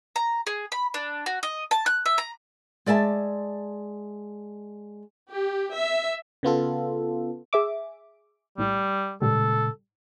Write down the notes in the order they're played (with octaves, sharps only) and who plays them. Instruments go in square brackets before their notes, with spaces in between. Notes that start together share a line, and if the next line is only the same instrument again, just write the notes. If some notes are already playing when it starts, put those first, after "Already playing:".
[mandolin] A#5
G#4
B5
D4
F#4
D#5
A5
F#6
E5
A#5
[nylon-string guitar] G#3 D5 E5 G#5 A5
[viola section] G4
E5
[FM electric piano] C#3 B3 F4 A4
[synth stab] G#4 E5 D6
[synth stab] A#1 A2 [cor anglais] G3
[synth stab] A1 G3 [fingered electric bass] A#2 C#3 G#3 [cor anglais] A4